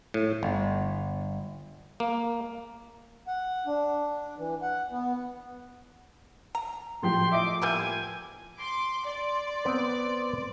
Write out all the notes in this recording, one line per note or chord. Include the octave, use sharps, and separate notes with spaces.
A2
G1
A#3
F#5
D4
E3
F#5
B3
A#5
A2 F3 G4 C6
D#5 E5 D6
G3 A#3 B3 G#5 E6 G6
C6 D6
D5 C6
B3 C4 B4